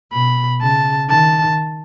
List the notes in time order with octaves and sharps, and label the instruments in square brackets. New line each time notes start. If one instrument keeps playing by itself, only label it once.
[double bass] B2 [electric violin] B5
[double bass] C#3 [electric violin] A5
[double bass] D#3 [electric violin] A5